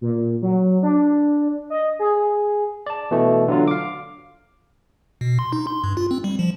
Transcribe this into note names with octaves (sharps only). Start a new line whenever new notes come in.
A#2
F#3
D4
D#5
G#4
D5 A5
B2 E3 A3
D3 F#3 F4
F5 D6
B2
C6
D#4
C6
G2
F4
C4
G3
F3